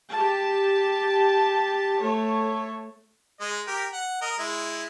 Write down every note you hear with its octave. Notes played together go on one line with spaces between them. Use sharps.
G4 A5
A3 A4 C#5
G#3 D#5
G4 A#4
F#5
A#4 D#5
G#3 E4